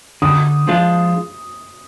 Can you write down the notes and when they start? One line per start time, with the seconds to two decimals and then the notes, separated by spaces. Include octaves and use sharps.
0.22 D3 D#6
0.68 F3 G#3 D4 F4